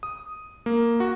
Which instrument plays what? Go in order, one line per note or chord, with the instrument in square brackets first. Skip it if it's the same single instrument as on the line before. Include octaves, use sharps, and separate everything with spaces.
[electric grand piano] D#6
A#3
F#4